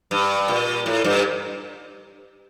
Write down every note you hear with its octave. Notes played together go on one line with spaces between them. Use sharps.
G2
A#2
A2
G2